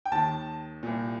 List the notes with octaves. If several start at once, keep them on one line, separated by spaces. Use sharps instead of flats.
G5
D#2 D#3 A5
C2 A#2